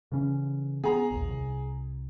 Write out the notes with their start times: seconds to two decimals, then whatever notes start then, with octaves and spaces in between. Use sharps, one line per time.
0.12 C#3 E3 C#4
0.84 B3 G#4 A#5
1.11 A#1 D#2
1.29 C2